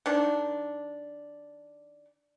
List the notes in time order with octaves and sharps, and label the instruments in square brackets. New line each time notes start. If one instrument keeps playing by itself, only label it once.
[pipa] D#3 D4